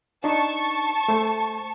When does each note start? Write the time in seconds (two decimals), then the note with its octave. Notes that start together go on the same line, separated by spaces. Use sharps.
0.24 D4 D#4 A5 C#6
1.08 A3 C5